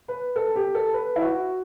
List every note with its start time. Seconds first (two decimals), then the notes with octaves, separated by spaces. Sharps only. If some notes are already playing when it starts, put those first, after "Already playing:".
0.08 B4
0.36 A4
0.56 G4
0.75 A4
0.94 B4
1.16 E4
1.21 F#4